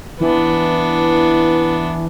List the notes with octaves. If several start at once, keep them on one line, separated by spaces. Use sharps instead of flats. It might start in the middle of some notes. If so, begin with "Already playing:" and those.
E3 B3 D4